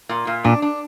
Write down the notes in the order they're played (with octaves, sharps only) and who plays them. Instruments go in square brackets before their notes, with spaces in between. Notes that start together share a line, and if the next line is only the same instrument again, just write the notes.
[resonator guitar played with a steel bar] A#2
A#2
[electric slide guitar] A#2 [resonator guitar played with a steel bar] D4
[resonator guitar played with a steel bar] D4